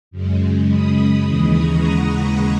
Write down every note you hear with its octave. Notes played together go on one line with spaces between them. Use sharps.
F#2 C#3 G#3
B5 D#6
B5 D#6
D#2 C#3 E3 G#3 B5 D#6
A#5 C#6
F#5 A#5